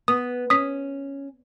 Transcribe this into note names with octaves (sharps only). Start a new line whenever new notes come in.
B3 D#6
C#4 D#6 B6